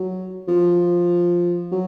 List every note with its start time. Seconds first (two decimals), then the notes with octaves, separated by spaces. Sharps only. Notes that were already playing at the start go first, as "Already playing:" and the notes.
Already playing: F#3
0.48 F3
1.72 F#3